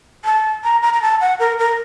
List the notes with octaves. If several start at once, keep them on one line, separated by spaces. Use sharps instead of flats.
A5
A#5
A#5
A#5
A5
F#5
A#4
A#4